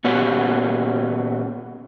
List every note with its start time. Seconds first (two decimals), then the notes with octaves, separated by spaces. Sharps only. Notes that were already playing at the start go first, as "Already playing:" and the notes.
0.04 A#2 B3 C#4 F#4 G4